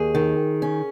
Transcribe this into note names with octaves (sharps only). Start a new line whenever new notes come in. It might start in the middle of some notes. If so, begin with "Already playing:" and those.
Already playing: D#2 G#4
D#3
C#4